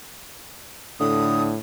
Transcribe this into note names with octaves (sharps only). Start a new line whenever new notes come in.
A2 D3 D#6